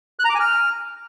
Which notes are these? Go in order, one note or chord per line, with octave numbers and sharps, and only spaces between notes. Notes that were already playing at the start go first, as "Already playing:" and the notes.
F#6
A#5
D6
G#5
F6